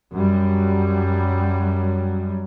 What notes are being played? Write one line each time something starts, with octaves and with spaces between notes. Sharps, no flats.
F#2 F#3 G3